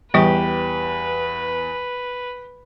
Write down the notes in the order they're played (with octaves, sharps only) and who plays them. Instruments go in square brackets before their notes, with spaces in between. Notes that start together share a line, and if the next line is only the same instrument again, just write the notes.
[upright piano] E2 [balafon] E3 G3 C#6 [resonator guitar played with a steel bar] G4 [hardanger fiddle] B4